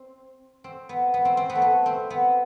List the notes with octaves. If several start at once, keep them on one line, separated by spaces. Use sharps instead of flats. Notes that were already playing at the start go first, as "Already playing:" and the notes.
Already playing: C4
C4
B3
B3
C4
C4
B3
A3
B3
C4
B3